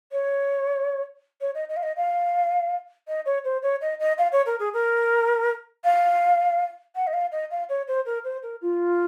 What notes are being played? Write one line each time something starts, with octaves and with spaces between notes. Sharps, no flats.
C#5
C#5
D#5
D#5
F5
D#5
F5
D#5
C#5
C5
C#5
D#5
D#5
F5
C#5
A#4
G#4
A#4
F5
F#5
D#5
F5
D#5
F5
C#5
C5
A#4
C5
A#4
F4